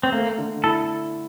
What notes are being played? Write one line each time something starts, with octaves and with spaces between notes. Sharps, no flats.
C4
A3 A#3
D3
E4 A4